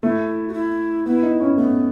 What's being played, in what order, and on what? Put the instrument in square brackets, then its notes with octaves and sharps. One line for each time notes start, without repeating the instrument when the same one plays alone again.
[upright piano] A3 [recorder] E4
[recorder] F#4
E4
[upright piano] B3 [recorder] E4
[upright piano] D#4
C#4
[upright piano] A3 [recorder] B3